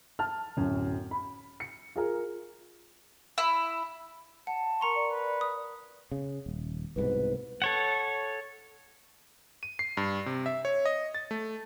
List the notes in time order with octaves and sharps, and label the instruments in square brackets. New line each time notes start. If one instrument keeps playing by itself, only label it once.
[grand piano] A5 F6
D1 F#2
B5
C#7
F4 G#4 A#4
[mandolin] E4
[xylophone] F#5 [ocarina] A5
[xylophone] A#4 A#5 C6 [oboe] C#6
[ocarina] D5
[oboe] B4
[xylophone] D#6
[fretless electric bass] C#3
D#1
[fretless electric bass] C2 G#2 B2 [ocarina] B4
[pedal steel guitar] A4 C#5 F#5
[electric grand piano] D#7
C7
G2
C3
E5
C#5
D#5
A6
A3